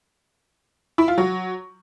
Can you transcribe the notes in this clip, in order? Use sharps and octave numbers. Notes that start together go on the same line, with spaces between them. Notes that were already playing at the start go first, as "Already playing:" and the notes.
E4
F4
F#3